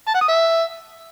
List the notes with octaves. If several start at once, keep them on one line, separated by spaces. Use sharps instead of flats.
A5
F#5
D#6
E5